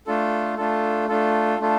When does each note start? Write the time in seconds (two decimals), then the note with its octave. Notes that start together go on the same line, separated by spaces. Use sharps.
0.07 A3 D4 F4 A4
0.57 A3 D4 F4 A4
1.09 A3 D4 F4 A4
1.59 A3 D4 F4 A4